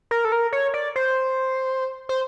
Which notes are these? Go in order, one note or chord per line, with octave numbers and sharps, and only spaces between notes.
A#4
A4
A#4
C#5
D5
C5
C5